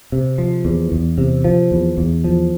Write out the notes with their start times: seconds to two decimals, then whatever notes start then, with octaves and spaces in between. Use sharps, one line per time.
0.12 C3
0.38 F3
0.65 E2
0.92 E2
1.18 C3
1.45 F3
1.71 E2
1.98 E2
2.24 F3